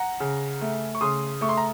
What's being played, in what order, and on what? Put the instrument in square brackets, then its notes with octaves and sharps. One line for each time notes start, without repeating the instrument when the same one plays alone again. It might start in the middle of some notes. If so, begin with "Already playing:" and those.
Already playing: [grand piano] F#5 A#5
C#3
A3
C#6
C#3 C6 D#6
A3 C#6
C6
A#5